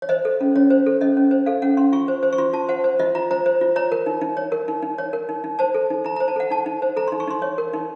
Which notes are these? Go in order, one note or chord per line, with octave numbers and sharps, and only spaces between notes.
C#5
C5 D#5
A4
C#4
C#4 C#5
C5
A4
C#4 D#5
C#4
C5
A4 F5
C#4 F#5
C#4 C6
F4 C#6
C5
C5
C#6
F4 C6
F4 A5
C5 F#5
C5
F4 D#5
F4 A#5
C5 A#5
C5
F4
C#5 A#5
A#4
D#4
D#4
C#5
A#4
D#4
D#4
C#5
A#4
D#4
D#4
C5 A5
A4
D#4
D#4 A#5
C5 A#5
A5
A4 F#5
D#4 A5
D#4
C5
A4 A#5
D#4 C6
C#6
D#4 C6
C#5
A#4
D#4